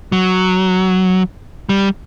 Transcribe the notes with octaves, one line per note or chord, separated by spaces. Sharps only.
F#3
G3